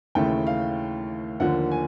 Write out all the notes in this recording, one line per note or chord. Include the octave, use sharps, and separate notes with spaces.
D#2 C#3 E3 A3 G5
F5
D#2 D3 F3 A#3 F#5
G#5